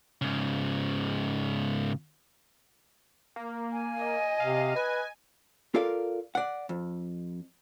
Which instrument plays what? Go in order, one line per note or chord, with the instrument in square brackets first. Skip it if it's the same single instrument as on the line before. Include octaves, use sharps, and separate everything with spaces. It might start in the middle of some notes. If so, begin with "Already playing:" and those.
[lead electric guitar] G#2 C#3
[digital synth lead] A#3
[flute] G#5
[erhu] D#5
[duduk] C3 [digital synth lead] F5
[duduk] B4 [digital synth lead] G#5
[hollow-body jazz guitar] F4 A4 A#4 D5 F5
D5 F#5
F2